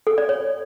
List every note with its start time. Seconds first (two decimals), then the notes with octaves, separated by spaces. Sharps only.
0.07 A4
0.18 D5
0.29 C#5